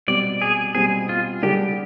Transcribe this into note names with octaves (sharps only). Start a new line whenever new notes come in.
B2 G3 C4 D5
G#4
B2 G3 C4 G#4
F4
D3 G3 D4 G4 G#4